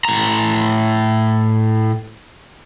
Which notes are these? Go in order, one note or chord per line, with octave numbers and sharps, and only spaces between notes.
A2 A#5